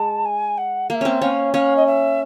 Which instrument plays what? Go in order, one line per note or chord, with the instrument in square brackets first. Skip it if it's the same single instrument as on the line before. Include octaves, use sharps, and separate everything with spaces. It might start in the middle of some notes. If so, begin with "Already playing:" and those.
Already playing: [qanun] G#3 [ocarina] A5
[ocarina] G#5
F#5
[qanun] A#3 [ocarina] E5 F5
[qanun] C4 C#4
[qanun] C#4 [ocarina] F5
[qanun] C#4 [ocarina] F5
[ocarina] D#5
E5